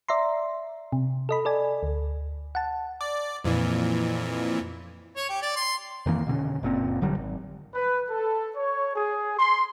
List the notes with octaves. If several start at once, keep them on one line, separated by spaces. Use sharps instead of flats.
D5 E5 A#5 C6
C3
A4 D#5 B5
A4 D5 G#5
D2
F#5 A5
D5
F2 A#2 E3
C#5
G4
D5
C6
F2 D#3 E3 A#3
B2 D3 C4 C#4
F#1 A#2 C4
E1 D3 F#3 G3
G#1
B4
A4
C#5
G#4
C6